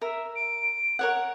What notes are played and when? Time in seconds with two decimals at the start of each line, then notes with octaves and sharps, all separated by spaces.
0.02 A#4 E5
0.36 D7
0.99 A#4 C#5 F#5